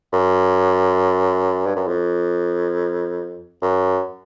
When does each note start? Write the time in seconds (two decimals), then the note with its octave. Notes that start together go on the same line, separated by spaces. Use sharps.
0.13 F#2
1.66 G2
1.76 F#2
1.88 F2
3.62 F#2